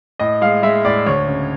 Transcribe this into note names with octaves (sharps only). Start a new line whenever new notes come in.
A2 D#5
G#3 F5
G#3 E5
A2 D5
D2 C#5
C#3